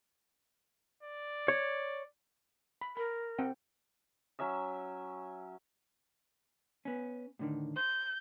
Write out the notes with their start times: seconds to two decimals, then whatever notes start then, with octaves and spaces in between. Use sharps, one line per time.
1.03 D5
1.48 C#5
2.81 B5
2.97 A#4 B5
3.39 C4 F#5 G5
4.39 F#3 C#4 E5 E6
6.85 B3 C#4
7.39 A2 D3 D#3
7.76 C5 G6